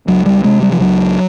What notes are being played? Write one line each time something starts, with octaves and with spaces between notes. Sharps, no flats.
C#2 F#3
G3
C3 G#3
G3
F3
C#2 F#3